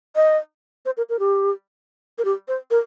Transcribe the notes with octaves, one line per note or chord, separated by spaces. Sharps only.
D#5
C5
A#4
A#4
G4
A#4
G4
C5
A#4